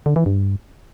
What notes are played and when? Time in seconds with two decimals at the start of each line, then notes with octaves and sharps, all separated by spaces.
0.06 D3
0.16 E3
0.26 G2